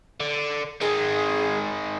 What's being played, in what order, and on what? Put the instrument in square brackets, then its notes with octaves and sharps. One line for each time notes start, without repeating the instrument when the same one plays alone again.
[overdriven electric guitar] D3
[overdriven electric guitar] D#3 G#3 [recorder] G#4